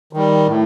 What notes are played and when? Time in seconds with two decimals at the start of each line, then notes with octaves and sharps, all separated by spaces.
0.13 D#3 G3
0.47 A2